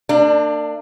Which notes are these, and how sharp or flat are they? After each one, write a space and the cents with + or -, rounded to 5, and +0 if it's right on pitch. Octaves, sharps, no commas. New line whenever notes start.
A#3 -45 D4 +20